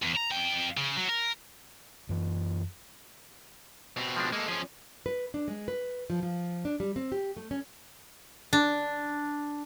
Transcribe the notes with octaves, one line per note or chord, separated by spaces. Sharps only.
E2
A#5
F2 G5
C#3
F#3
A#4
F#2 E3
B2 C4
F3 G#3 D4
G#3 A#3 A4
F3 C#4 G#4 G#5
B4
D4
G#3
B4
F3
F3
D4
G3
C4
G4
A3
C#4
D4